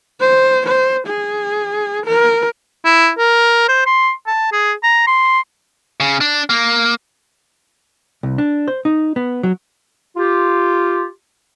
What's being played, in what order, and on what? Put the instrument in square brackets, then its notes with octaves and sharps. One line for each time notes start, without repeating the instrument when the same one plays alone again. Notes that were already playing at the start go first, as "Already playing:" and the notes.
[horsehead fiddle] C5
C5
G#4
A#4
[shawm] E4
A#4
C5
C6
A5
G#4
A#5
C6
[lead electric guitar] C#3
D4
A#3
[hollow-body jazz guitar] C2
D4
C5
D#4
B3
F#3
[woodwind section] F4 G4